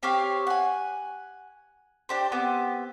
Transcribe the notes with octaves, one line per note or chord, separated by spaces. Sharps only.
C4 G4 C#5 F5
F#5 G#5
D4 G4 C5
B3 C4 G4